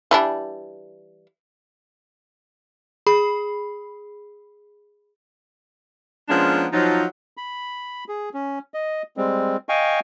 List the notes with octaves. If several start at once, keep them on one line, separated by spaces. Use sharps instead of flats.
E3 G3 D4
G#4 B5
F3 G#3 A#3 B3 C#4 D4
F3 F#3 D#4
B5
G#4
C#4
D#5
G3 G#3 C4
D#5 F5 G5 G#5 C#6